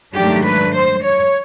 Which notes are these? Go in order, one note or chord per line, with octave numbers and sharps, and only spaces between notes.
G#2 D#3 F#3 A3 D4 G4
B4
C5
C#5